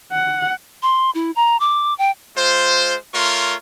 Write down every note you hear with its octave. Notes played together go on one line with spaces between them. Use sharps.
F#5
C6
E4
A#5
D6
G5
G#3 F4 C5
A3 F4 A#4 C#5 C6